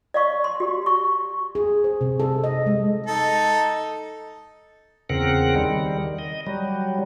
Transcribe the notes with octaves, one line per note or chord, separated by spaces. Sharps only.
D5 F5 C#6
C6
F#4 G4
C#6
G#4
C5
C3
A4
D#5
G#3
D#4 A4
E2 C#3 C4 A#4 F#5
D#3 G3
D#5
F#3 G3